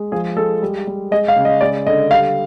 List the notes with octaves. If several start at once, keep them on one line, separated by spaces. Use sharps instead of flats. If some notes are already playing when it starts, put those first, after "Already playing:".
Already playing: G#3
F3 G#4
G#3 A4
G3
G3
G#3 D#5
F5
C#3
D#5
G#3 D5
D3 D#5
G3 F5